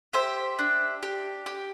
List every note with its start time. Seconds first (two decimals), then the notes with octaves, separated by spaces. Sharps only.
0.13 G4 C5 E5
0.59 D4
1.03 G4
1.46 G4